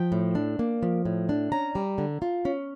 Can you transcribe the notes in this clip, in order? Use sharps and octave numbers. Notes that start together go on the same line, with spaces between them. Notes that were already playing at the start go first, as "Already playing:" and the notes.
Already playing: F3 G5
A2
D4
A#3
F3
A2
D4
C#4 A#5
G3
D3
F4
C#4